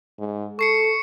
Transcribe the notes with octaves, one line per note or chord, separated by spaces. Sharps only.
G#2
A4 C#6 C7 C#7